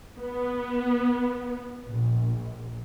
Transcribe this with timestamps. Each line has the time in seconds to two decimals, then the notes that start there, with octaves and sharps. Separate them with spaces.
0.18 B3
1.86 A#1